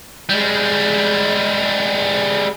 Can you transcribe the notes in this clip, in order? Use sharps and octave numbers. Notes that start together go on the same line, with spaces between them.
G3 G#3